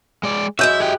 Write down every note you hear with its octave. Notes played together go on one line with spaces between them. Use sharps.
G#3 D5
F#2 G#3 E4 F#4 E5 G6
G4 G#4 G5 F#6